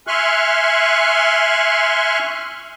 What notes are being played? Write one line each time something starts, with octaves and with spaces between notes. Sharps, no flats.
E5 G#5 C6 C#6 F6 F#6